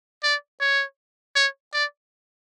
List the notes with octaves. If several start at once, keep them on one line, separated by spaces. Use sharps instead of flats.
D5
C#5
C#5
D5